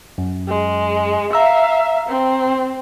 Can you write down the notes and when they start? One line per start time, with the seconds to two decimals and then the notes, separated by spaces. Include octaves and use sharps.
0.18 F#2
0.48 G#3
1.33 E5 F5 A#5 E6
2.09 C4